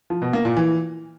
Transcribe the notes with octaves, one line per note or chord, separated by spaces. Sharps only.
F3
B2
A#3
A#2
E3